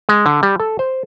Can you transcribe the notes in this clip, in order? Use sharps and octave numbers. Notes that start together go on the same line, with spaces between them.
G#3
D3
G3
A4
C5